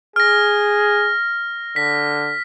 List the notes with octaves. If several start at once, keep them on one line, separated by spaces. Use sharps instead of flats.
G#4 F6 A#6
D3 B6